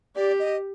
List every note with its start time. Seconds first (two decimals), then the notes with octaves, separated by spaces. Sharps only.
0.16 G4 D5
0.39 D#5